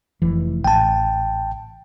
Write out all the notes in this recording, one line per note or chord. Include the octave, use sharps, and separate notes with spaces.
F1 E3
A1 G5 A5